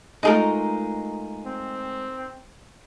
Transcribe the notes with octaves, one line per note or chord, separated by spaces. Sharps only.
G#3 A3 D#4 F4 G#4 A#4
C4